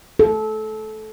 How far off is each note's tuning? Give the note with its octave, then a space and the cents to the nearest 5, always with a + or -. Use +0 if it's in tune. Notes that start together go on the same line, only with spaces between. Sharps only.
A4 -20